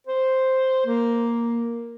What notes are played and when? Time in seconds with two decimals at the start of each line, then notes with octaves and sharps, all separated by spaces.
0.07 C5
0.86 A#3